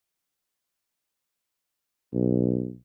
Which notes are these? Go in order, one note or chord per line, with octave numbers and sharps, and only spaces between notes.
B1